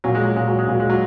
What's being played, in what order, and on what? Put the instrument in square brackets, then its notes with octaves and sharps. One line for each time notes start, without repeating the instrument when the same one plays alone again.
[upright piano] A#2 [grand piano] F#3
[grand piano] G#3
F#3
[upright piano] A#2 [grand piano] G#3
[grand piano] F#3
G#3
[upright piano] A#2 [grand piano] F#3
[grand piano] G#3
F#3